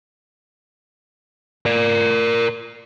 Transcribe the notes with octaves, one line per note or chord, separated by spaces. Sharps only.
A#4 D5